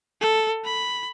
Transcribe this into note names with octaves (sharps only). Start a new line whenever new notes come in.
A4
B5